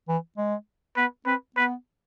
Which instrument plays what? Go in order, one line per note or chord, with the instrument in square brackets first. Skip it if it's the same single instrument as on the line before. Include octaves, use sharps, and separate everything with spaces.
[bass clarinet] E3
G#3
[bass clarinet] B3 [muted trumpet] B4
[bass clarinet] C4 [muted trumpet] B4
[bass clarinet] B3 [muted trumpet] B4